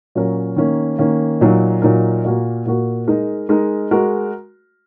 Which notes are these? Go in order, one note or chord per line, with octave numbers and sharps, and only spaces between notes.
A#2 F#3 C#4 A#4
D#3 A#3 C#4
D#3 A#3 C#4
A#2 F#3 D#4 A#4
A#2 F#3 D#4 A#4
A#2 A#3 F#4 A#4
A#2 A#3 F#4 A#4
G#3 D#4 A#4
G#3 D#4 A#4
G#3 F#4 A#4